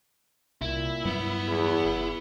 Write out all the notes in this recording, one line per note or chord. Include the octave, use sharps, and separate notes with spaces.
C2 A#2 E4
G2 F#3 G3 B3
E2
F#1